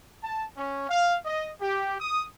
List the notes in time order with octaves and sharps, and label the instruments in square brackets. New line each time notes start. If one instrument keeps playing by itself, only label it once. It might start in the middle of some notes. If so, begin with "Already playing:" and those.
[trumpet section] A5
C#4
F5
D#5
G4
D#6